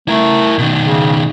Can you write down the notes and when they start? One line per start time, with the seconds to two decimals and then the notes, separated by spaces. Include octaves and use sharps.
0.08 A3 E4 A#4
0.59 B2 D#3
0.84 C#3